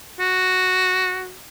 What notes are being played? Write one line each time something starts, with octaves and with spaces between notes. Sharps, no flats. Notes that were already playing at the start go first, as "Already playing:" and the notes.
F#4